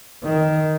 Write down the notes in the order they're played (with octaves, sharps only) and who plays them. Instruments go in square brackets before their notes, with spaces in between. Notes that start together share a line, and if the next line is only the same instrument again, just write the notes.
[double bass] D#3